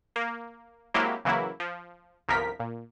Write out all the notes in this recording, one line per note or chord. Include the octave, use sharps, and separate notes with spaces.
A#3
F#3 G#3 A#3 C4 E4 G4
C#3 E3 F#3 A#3 E4
F3
G1 C2 F3 A#4 B6
A#2